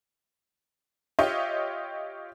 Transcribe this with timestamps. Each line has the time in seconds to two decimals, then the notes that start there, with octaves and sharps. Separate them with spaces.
1.19 F4 G4 C#5 D#5 E5